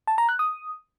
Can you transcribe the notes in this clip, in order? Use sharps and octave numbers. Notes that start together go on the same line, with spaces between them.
A5
A#5
F#6
D#6